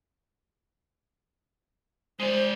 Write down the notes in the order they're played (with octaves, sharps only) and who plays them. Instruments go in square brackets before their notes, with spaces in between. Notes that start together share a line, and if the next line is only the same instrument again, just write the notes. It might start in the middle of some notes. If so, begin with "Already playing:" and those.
[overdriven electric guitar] G#3 D5 [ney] C5